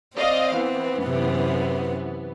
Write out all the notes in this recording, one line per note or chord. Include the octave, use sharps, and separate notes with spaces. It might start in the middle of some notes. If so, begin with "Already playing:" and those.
C4 D5 D#5 F5
E3 B3
F#2 C3